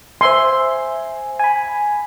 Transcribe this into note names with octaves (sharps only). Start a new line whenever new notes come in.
C5 E5 G#5 C6
G#5 B5